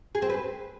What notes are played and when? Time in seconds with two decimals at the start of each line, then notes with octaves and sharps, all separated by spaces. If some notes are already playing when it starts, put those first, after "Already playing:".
0.15 G#4
0.22 C4
0.30 B4